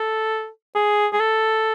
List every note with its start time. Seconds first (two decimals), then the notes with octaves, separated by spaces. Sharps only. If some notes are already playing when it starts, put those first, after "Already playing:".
Already playing: A4
0.76 G#4
1.13 G#4
1.20 A4